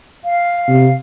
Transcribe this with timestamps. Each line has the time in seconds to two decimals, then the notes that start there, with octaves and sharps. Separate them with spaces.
0.24 F5
0.68 C3